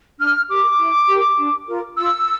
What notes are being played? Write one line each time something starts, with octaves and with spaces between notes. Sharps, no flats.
D4 F6
G4 A#4 D6
E4
G4 A#4
D4
F4 A#4
F4 E6